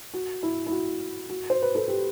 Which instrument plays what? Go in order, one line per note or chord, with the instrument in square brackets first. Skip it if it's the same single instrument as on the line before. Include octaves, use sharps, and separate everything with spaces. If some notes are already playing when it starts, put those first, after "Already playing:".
[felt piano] F#4
E4
E4
F#4
F#4
C5
B4
A4
G4